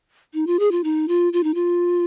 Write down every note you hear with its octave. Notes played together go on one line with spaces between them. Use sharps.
D#4
F4
G#4
F4
D#4
F4
F4
D#4
F4